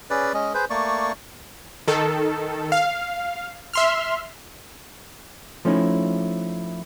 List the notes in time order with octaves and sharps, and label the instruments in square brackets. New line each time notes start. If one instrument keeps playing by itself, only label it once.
[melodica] C#4 G#4 B4 D5
G#3 C#4 D#5
G#4 B4 C5
A3 A#3 D5 C#6
[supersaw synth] D#3 A4
F5
E5 C6 F6
[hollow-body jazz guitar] F3 A3 C#4 D#4 E4